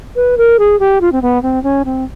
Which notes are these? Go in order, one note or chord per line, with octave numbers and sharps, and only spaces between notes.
B4
A#4
G#4
G4
F4
C4
B3
C4
C#4
C4